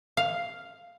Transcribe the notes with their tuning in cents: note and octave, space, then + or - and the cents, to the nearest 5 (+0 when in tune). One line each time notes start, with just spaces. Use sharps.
F5 +0